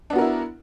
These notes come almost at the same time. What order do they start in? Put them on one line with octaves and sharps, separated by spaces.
D4 B3 F#4 A#4 E4